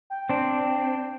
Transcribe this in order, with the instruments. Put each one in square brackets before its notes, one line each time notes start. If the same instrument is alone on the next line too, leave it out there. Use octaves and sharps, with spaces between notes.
[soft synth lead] G5
[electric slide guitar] C4 D4